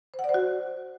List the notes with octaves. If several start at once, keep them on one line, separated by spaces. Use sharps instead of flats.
C5
F#5
D5
C5
F#4